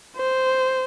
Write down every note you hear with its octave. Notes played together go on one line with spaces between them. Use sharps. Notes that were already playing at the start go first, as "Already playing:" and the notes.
C5